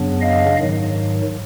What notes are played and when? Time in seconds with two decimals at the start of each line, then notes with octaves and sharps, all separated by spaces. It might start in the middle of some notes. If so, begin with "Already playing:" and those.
Already playing: F#2 C#3 F#3 B3 D4
0.21 D#5 F5
0.59 G#2 D#3 F#3